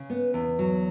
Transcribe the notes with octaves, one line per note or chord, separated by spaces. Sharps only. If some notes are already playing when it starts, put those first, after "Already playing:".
Already playing: C#3
B3
E2
F#3